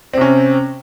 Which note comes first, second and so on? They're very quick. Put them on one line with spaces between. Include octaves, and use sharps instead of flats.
C4 C3 C#4